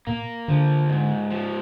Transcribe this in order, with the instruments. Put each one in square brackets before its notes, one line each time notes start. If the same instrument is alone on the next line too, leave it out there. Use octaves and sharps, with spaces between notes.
[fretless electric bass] A#2 [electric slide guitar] A#3
[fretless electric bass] D3 [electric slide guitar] F3
[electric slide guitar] G#2
F3